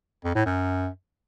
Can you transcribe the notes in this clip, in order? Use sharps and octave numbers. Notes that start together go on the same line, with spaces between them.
F2
A2
F#2